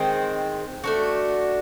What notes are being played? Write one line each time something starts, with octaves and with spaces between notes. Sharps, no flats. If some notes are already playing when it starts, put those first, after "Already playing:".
Already playing: D#3 G#3 C4
A3 D4 F#4